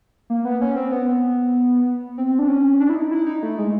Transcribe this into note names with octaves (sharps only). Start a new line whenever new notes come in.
A#3
B3
C#4
C4
B3
C4
D4
C#4
D4
E4
D#4
E4
D#4
A3
G#3